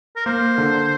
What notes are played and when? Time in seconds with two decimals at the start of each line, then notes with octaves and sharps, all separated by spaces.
0.16 A#4
0.26 A#3 C5
0.58 D3